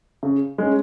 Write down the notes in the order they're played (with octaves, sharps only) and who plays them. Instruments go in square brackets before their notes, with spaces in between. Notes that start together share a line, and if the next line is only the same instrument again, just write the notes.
[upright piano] C#3
G#3 C#4